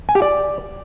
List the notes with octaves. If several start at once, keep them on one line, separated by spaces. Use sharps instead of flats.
G#5
G4
D5